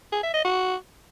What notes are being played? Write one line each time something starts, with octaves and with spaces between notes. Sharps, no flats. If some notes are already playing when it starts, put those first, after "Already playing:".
G#4
E5
D#5
F#4